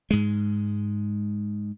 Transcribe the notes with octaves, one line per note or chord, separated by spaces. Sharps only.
G#2 G#3